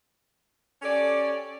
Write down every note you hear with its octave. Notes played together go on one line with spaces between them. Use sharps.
C#4 G4 A4 D5